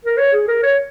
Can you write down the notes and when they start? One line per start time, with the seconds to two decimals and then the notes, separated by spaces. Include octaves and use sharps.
0.05 A#4
0.17 C#5
0.32 G#4
0.48 A#4
0.63 C#5